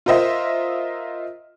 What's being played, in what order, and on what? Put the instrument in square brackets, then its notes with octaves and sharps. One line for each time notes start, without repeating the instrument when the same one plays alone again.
[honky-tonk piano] F4 A#4 C5 D#5 E5